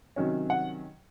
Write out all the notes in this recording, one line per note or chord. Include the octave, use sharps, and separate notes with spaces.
C3 D#3 F#3 C#4
F#5